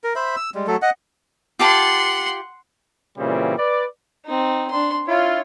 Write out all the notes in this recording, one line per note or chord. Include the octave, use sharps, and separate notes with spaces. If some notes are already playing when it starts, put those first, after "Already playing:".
A#4
C5 E5 B5
E6
G3 G#3
F#3 A3 A4
D#5 F#5
F4 G4 F#5 A5 C6
A#2 C#3 E3 G3 C4
B4 D5
C4 D#4
D4 C6
E4 F4 C#5